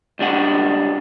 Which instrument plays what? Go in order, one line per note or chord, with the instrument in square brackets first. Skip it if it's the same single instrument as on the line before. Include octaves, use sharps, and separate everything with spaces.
[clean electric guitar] C#2 G3 D4 F#5